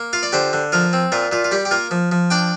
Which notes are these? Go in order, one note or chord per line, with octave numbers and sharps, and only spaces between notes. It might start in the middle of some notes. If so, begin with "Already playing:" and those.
Already playing: A#3
F4 F5
D5
D3 G4 C5
D3
F3 F4 A#4
C4
A#2 F4 A#4
A#2 F4
F4
G3 G4
G4
A#3 F4 A#4
F3
F3
D4 D5 G5